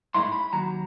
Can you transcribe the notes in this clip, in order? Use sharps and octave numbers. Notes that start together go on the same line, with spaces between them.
G#2 G#3 A#3 D#4 E4 C6
B5
D#2 F#3 A#5